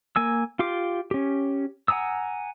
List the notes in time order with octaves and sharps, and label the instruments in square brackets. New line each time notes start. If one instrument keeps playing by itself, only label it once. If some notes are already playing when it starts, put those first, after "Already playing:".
[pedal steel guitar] A#3 G#5 E6
F4 G4 C6 D6
C#4 G4
F#5 G#5 A#5 D#6 E6